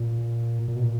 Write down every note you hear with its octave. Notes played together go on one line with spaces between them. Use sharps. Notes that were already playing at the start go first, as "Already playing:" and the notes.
Already playing: A#2
A#2
B2
A#2